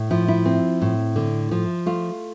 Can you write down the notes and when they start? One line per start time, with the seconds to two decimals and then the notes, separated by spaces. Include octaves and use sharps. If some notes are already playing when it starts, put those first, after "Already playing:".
Already playing: A2
0.11 F3 E4
0.28 E4
0.46 C4
0.82 A2
1.16 D3
1.51 F3
1.86 A3 F4